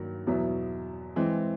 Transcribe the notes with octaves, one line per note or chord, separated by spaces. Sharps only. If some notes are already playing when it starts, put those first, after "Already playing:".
Already playing: G2 D#3 F#3 A#3
E2 B2 F#3 B3 E4
E3 G#3 C4